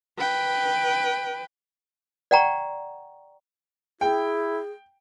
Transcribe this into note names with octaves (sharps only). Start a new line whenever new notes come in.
B4 G5
D5 F#5 G5 A#5 C#6
E4 G#4 G5